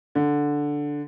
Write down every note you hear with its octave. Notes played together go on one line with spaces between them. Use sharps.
D3